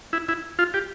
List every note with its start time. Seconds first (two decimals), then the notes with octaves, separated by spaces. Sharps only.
0.13 E4
0.28 E4
0.59 F4
0.74 G4